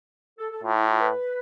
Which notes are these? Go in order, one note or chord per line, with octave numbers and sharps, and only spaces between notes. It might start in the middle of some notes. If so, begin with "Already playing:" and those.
A4
A4
A2 F4
E4
F4
B4